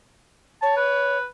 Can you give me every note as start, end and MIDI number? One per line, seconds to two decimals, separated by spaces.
0.62 1.17 73
0.62 0.72 81
0.77 1.25 71